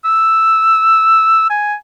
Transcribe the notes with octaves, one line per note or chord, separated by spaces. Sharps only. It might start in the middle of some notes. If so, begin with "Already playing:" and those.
E6
G#5